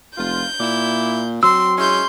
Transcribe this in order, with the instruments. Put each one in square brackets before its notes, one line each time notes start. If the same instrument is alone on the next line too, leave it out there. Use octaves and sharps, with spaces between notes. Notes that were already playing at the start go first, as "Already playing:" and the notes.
[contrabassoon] F1 [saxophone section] F4 [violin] G6
[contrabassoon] A#2 [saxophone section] E4 D5
[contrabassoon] F#3 [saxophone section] C4 [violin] C6 [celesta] E6
[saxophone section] G#3 C#4 E4 [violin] C6 G6